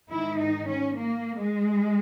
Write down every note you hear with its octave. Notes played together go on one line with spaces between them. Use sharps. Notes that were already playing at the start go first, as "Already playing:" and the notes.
G#2 D#3 E4
D#4
C#4
A#3
G#3